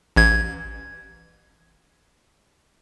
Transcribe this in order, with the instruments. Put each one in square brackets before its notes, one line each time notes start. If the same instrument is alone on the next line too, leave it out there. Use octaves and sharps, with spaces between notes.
[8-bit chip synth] A1 G#6